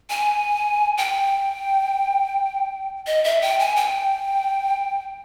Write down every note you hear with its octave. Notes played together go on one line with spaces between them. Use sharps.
G#5
G5
D#5
E5
G5
G#5
G5